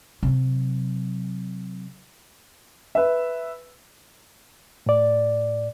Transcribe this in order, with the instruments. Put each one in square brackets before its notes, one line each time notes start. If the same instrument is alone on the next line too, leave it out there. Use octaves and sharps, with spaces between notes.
[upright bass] C3 F#3
[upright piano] B4 E5
[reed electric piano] A2 D5